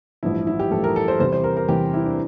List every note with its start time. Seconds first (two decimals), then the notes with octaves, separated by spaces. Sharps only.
0.23 A1 G2 F3 E4
0.47 E4
0.59 G4
0.71 A1 G2 F3 A4
0.84 A#4
0.96 A4
1.08 C5
1.20 E2 C3 E3 G3 C5
1.32 C5
1.44 A#4
1.57 A#4
1.68 E2 C3 E3 G3 G4
1.94 E4
2.06 D4